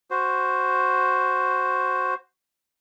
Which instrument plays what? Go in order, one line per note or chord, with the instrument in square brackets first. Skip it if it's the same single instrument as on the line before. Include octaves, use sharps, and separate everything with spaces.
[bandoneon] F#4 C5